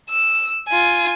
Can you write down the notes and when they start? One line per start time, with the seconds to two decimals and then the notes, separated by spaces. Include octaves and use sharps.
0.10 E6
0.68 F4 G#5